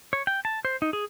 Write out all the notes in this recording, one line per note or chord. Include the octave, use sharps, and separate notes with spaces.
C#5
G5
A5
C5
D#4
G#4